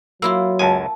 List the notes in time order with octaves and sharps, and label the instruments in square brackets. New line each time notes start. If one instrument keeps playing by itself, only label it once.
[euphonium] F#3 [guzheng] A#3 E4 F4 [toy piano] E6
[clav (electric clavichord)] C#2 F#2 G#5 [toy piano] A5 D#6